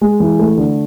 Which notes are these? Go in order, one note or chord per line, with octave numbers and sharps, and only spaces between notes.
G#3
E3
A3
D3